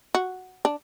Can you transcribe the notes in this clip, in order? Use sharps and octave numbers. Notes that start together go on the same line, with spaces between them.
F#4
D4